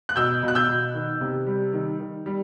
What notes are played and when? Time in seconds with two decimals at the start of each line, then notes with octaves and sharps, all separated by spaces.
0.09 F#6
0.16 B2 E6 G6
0.43 B2
0.48 F#6
0.55 E6 G6
0.68 B2
0.95 D#3
1.21 C3
1.47 G3
1.73 D#3
1.99 D#3
2.26 G3